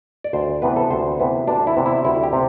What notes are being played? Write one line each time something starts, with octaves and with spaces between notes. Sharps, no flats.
D5
D2 C5
C3 E3 B3 B4
A4
D2 C5
C3 E3 B3
D2 D4
E4
C3 E3 B3
E4
D2 E4
G4
C3